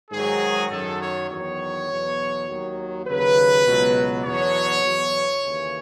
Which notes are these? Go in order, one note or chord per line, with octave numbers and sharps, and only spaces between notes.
G#2 D#3 F#3 G#4
F#2 D#3 F#3 A4
C#5
E2 D#3 F#3 C#5
E2 B2 F#3
D#2 D#3 F#3
D#2 C#3 F#3 B4
C#2 B2 F#3
E2 B2 F#3 C#5
E2 B2 F#3
D#2 C#3 E3